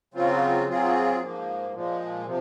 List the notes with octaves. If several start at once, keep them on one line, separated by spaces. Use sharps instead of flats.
C#3 F#3 C4 F4
F#3 C4 F4 G#4
G#2 F3 A#3
A#2 F3 G#3
C3 F3